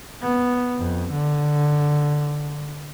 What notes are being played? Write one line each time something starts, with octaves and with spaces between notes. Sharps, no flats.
B3
F2
D3